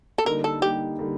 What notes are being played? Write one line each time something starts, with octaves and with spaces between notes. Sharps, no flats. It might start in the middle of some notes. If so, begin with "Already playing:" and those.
A4
D3 G3 A#3 D#4 A#4
A4
D3 G3 A#3 D#4 G4
D3 G3 A#3 D#4